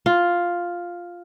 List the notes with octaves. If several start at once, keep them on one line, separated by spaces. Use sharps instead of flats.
F4